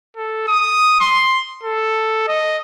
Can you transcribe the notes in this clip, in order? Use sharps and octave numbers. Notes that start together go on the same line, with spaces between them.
A4
D#6
C6
A4
D#5